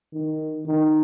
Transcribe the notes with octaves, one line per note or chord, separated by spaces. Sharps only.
D#3
D#3